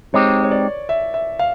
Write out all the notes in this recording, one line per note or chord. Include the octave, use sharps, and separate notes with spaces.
G#3 C4 D#4 G4 C#5
C#5
D5
E5
E5
F5